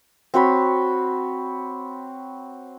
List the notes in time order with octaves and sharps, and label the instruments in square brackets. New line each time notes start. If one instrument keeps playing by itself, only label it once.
[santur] C4 F#4 C#5 B5